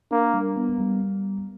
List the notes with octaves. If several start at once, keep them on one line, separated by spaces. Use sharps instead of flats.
A#3 D4
G3
B3
G3